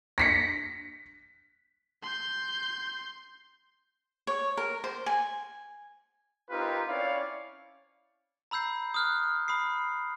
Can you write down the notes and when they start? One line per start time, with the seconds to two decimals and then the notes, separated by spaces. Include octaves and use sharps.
0.18 A#6 B6 C#7
2.02 C6 G6
4.27 C#5
4.57 A#4
4.84 C5
5.06 G#5
6.50 C4 D#4 F4 G4 A#4 B4
6.87 C4 C#4 E4 C#5 D5 F5
8.51 A#5 B5 E6 G6 C7
8.94 D#6 F6 F#6
9.48 B5 D#6 C7